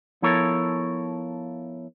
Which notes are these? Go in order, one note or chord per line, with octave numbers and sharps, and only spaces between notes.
F3 B3 E4 A4 A#4 C#5